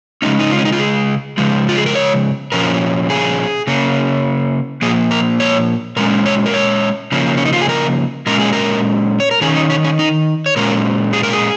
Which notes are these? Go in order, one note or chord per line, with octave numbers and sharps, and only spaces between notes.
C#3 G#3 C#4 D#4
D#4
F4
C#4
D#4
F4
G#4
C#3 F3 G#3
F4
G#4
A#4
C#5
A#2 F3 C#4 A#4
G#4
C#3 A#3 C#4
A#2 F3 A#3 G#4
A#4
C#5
A#2 G#3 C#4 A#4
C#5
A#4
C#5
C#3 F3 A#3 C#4
C#4
D#4
F4
G#4
A#4
A#2 G#3 C#4 A#4
G#4
A#4
C#5
A#4
D#3 C#4 G#4
D#4
C#4
C#4
D#4
C#5
A#2 G#3 C#4 A#4
G#4
A#4
G#4